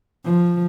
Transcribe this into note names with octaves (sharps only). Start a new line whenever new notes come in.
F3